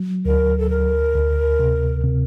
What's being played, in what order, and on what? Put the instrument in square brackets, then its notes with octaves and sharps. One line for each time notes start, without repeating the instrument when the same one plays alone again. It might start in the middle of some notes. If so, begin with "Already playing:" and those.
Already playing: [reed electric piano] F#3
[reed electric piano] D2 [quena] A#4
[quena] A4
[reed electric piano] D2 [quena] A#4
[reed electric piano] D2
C3
C3